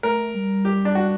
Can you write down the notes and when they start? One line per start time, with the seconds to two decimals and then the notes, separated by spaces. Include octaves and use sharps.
0.03 A3 A#4
0.34 G3
0.65 G4
0.85 D4
0.95 F#4